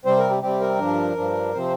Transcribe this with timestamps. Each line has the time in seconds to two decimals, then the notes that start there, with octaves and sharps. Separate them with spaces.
0.05 C3 G3 C4 C5
0.18 A#4
0.30 G4
0.42 C3 G3 C4 G4
0.60 A#4
0.79 G2 F3 D4
1.16 G2 F3 D4
1.53 C3 F3 C4 C5